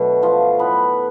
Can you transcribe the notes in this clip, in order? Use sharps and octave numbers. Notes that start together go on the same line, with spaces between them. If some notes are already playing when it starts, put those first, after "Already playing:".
Already playing: B2 D3 F#3 A3
F3 F4
A2 F#3 A3 B3 B4